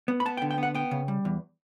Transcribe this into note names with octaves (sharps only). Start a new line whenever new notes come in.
B3
B5
B3 A5
G5
D3
G5
B3 F#5
B3 G5
C#3
G3
E2